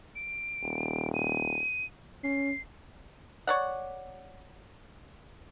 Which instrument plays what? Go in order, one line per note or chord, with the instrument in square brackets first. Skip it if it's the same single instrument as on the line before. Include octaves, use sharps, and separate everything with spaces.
[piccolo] D7
[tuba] D#1
[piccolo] D#7
[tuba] C#4 [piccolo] C7
[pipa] C#5 D5 F#5